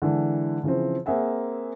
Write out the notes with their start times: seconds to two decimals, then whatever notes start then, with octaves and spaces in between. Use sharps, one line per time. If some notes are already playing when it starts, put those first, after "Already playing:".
0.02 D3 E3 G#3
0.64 C#3 E3 F3 C4
1.06 A#3 C4 G#4 E5 F#5